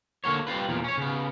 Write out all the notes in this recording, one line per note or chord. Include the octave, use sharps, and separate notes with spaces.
D3 A#3 F#4 C#5
G3 C4 F4 B4
E2 A#2 E3 F3
C#4 C#5
C#3 B3